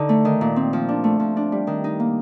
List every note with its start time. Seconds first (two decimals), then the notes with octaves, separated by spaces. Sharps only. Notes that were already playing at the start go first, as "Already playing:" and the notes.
Already playing: D3 D#4
0.09 A3
0.25 D#3
0.41 A#2
0.56 C4
0.73 F3
0.89 D4
1.04 A3
1.20 F3
1.37 D4
1.52 G3
1.67 D#3
1.84 D#4
2.00 A#3